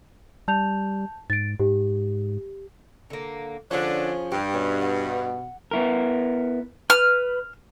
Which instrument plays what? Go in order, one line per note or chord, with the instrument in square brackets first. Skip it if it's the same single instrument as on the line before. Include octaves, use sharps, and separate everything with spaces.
[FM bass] G3 [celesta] A5 G6 F7
[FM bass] G#2 [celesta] A6 D7
[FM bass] G#2 [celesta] G4
[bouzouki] D3 A#3
[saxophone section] D3 D4 [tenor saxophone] F3 [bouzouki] C#4 G#4
[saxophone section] G2 [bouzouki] G4
[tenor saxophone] B2 [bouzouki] C#4
[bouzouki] F#5
[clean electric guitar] B3 E4 A#4
[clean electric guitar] B4 [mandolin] F6